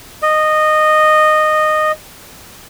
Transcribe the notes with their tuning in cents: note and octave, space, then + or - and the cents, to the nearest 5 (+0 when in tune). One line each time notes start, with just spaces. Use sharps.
D#5 -15